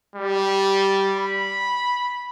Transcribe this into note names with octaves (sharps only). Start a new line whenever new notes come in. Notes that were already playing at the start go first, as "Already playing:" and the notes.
G3
B5